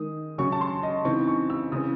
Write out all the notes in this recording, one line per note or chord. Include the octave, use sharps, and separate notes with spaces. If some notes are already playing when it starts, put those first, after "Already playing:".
Already playing: D#3 G#3 D#4 D#6
C#3 F#3 C#4 C#6
A5
C6
D#5
C#3 E3 C4 D#4 C#6
C#6
E6
C#3 E3 C4 D#6